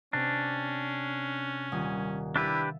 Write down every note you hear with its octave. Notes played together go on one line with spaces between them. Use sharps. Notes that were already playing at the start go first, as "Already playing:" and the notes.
C3 C#4 D4
D#1 G#5 D#6
D4 E4 G4 B4 E5 A6